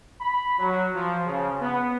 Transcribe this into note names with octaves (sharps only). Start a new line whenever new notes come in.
B5
F#3
F3
C#3
B3